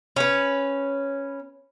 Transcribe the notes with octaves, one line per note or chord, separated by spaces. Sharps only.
C#4 B4